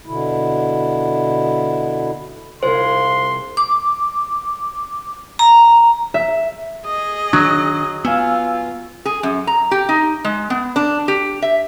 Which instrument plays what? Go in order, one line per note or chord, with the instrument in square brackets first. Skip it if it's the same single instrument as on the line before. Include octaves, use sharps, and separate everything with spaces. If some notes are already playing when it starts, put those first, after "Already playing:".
[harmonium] B2 D3 E4
[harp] C2 F4 G#4 [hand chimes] C5 [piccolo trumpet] C6
[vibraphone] D6
A#5
[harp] E5
[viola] G#4 D#5
[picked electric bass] D#3 D4 [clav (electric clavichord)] F#3
[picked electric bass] B3 [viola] F4 [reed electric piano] F5 G#5 E6
[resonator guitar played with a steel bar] G#4
F#2
A#5
G4
D#4
G#3
B3
D4
G4
E5